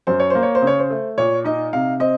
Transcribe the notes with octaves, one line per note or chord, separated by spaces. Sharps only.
F#2 C5
C#5
A#3 C5
C#5
C5
C#3
C#5
C5
A3
A#2 C#5
D#4 D#5
C3 F5
C4 D#5